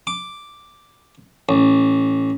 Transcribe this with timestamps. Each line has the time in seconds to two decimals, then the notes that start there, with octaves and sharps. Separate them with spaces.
0.07 D6
1.49 A1